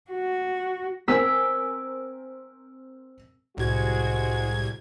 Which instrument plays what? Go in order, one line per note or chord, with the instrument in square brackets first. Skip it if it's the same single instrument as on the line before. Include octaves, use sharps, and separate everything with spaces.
[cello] F#4
[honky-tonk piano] C4 A#4 G#5 [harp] E6 B6
[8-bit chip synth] C2 G#6 [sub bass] A2 [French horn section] G#3 C4 F#4